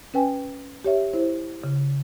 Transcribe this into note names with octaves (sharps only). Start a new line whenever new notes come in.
C#4 B4 G5 G#5
G4 C#5 E5
E4 C5
C#3